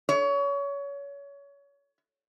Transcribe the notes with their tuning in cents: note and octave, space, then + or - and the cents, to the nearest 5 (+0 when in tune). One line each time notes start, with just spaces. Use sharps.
C#5 +25